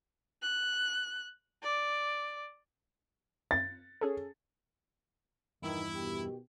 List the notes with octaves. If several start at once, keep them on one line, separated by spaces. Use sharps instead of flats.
F#6
D5
A6
C#4 G#4 A4
E2 G2 B2 D#3 E4
B2 D#3 G4